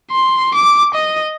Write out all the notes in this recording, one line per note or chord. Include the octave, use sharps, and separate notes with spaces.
C6
D6
D#5